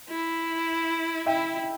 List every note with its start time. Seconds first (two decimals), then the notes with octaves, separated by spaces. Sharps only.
0.09 E4
1.26 E4 E5 G5